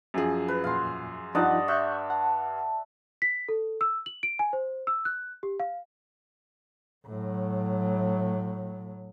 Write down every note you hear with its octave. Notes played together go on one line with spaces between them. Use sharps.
F#2 F3 G#4
B4
E2 A#2 F5 C6
G2 F3 D#4 F4 D5 D#5 F#5
E5 C#6 F#6 G6
F#5 A5
B6
A4
E6
F#7
D7
G#5
C5
E6
F#6
G4
F5
A2 F#3